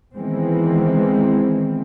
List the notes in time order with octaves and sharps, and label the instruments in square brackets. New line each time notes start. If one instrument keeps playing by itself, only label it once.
[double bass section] D#3 E3 G#3 B3 C4